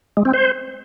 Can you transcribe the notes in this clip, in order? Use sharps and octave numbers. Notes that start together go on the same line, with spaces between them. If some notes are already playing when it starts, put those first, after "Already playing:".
G#3
C4
C5